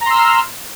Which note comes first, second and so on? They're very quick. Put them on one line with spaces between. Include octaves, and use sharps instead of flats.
A#5 C6 E6 F6